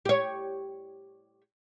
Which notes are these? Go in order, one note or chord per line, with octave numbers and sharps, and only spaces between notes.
G4 C#5